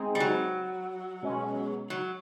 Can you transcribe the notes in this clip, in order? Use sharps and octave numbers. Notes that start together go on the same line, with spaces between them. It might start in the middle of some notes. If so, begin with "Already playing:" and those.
Already playing: G#3 C4 D#4 G#4
G3
F#3
B2 G#3 C#4
F#3